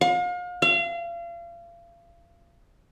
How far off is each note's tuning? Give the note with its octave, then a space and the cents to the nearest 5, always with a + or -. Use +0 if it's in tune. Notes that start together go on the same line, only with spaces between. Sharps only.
F5 +40
F5 -35